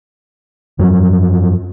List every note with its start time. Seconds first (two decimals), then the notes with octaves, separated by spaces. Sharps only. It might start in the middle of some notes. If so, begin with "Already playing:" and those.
0.79 F#2 F3 F#3